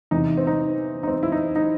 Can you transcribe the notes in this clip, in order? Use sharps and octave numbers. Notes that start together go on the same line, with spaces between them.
E2 C3 E3 D#4
C4
D#4
D#4
C4
E4
D#4
D#4